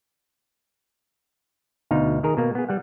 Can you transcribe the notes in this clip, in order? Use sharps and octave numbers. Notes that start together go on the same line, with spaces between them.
D2 B2 D#4 F5
D#3 G#4 A#4 A#5
B2 A#3
B3 G#4
G3 F#5